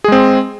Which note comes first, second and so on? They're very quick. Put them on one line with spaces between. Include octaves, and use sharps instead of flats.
G#4 G#3 C4